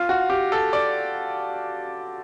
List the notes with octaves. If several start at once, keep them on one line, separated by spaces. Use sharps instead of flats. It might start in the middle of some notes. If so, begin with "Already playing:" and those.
Already playing: F4
F#4
G4
A4
D5